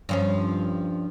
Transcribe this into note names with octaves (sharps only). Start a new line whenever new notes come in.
G2 F3 C#4